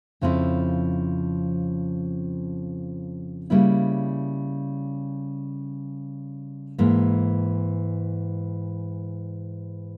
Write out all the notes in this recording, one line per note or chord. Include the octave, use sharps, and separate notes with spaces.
F2 C#3 F3 C4 E4
C#3 G3 A#3 E4
G#2 E3 A#3